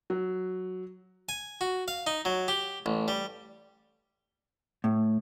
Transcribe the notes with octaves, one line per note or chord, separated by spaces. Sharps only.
F#3
G#5
F#4
F5
D#4
F#3
G4
A1
G3
A2